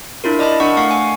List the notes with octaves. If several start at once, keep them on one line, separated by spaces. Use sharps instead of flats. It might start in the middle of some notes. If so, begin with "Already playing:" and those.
D4 E4 F4 A#4
D5 D#5 A5 B5
D4 A#4 F#5 C#6
A3 F5 F#5 C#6
G#5